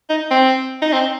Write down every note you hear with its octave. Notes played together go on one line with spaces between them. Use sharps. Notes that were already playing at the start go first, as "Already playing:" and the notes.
D#4
C4
D#4
C4